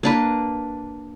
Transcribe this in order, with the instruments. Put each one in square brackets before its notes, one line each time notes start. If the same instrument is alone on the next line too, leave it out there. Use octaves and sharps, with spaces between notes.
[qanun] A#3 D4 B4